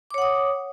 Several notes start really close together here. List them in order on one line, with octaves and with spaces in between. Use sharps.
D6 C#5 F#5 D#6